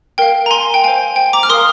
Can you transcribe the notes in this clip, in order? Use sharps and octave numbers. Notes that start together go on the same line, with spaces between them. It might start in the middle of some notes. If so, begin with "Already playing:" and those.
A#4 F5 G5
A#5
G#5 C6
G5
C5 F5 G#5
G5
A#5 D6
F6
A#4 F5 C6 D#6